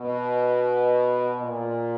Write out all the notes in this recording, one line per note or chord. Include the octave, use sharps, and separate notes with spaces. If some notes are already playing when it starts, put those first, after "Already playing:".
Already playing: B2
A#2